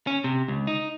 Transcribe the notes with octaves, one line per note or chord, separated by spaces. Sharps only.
C#4
C3
C#2
D#4